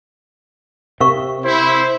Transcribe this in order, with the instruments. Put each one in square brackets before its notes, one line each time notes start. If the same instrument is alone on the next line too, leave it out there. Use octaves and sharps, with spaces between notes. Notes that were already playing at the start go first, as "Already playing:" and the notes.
[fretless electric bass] C3 [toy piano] A#4 F5 C#6
[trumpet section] E4 [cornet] C5